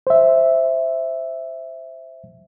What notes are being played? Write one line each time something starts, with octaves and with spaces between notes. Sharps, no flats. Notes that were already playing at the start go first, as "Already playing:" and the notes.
C5 E5